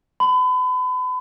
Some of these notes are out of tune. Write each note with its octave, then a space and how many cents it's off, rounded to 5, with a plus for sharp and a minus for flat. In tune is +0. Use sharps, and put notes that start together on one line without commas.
B5 +35